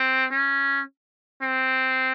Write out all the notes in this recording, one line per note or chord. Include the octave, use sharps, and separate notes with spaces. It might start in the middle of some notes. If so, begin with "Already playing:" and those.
Already playing: C4
C#4
C4